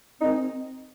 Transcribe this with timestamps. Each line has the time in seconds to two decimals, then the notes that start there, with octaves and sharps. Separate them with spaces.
0.20 D#3 G#3 C4 D#4